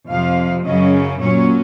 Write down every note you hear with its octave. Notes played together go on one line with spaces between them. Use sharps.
F2 C3 F3 F5
F#2 C#3 F#3 C#4 D#5
A#2 F#3 C#4 C#5